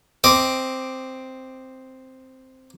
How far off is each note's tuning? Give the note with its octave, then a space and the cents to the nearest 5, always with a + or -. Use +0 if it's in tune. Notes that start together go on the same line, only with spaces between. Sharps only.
C4 +0 D#5 +0 D6 +0